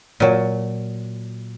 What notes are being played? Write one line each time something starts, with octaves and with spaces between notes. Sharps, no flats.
A#2 F#3